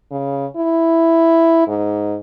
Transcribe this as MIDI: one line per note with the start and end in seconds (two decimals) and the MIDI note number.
0.11 0.46 49
0.57 1.63 64
1.68 2.17 44